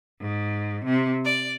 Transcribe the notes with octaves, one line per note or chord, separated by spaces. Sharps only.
G#2
C3
D5